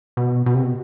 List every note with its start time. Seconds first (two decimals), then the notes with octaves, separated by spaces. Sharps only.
0.17 B2
0.46 B2
0.54 C3
0.63 B2